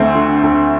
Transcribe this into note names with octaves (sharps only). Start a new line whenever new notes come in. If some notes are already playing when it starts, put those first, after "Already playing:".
Already playing: D2 A3 C4
D3
D2